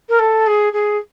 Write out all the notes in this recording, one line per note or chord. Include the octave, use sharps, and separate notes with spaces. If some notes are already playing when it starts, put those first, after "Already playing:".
A#4
A4
G#4
G#4